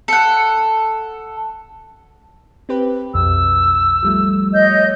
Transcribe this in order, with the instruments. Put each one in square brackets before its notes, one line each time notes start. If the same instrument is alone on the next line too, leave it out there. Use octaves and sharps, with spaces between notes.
[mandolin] A4 F#5
[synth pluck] C4 G4 B4
[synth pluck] B1 F2 [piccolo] E6
[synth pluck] F3 G3 A3
[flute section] C#5 D#5 [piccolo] G6